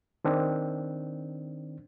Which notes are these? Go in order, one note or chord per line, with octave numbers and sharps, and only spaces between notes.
D#3 C4 D4